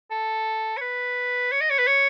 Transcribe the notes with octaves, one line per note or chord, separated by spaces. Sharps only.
A4
C#5
B4
C#5
D#5
C#5
B4
C#5